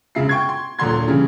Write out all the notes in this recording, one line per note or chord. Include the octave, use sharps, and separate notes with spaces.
E1 C#3 E5 C7
G5 C#6 G#6
C6
D#1 A#2 D3 A#5 C6 G#6
C#3 E3 G3 C#4